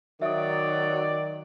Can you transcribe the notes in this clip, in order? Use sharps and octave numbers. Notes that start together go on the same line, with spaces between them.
D#3 F#3 D5 E5 D#6